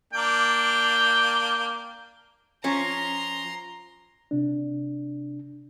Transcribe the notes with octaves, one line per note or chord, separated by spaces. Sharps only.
A#3 D4 G5
F3 C#4 A#5 C6
C3 D4